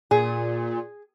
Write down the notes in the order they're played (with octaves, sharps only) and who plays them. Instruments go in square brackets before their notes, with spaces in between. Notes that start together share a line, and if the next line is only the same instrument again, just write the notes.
[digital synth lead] A#2 [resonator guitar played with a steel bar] G#4